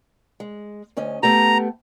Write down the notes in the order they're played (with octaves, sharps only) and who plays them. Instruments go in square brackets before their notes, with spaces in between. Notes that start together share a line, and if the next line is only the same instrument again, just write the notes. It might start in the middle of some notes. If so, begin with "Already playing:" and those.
[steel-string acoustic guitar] G#3
D2 C#4 D#5
[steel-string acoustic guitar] A3 B3 G4 [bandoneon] A#5